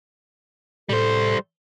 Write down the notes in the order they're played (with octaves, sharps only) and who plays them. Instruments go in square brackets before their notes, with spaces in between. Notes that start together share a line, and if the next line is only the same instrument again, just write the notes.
[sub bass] A2 [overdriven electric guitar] G3 C5 [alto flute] A4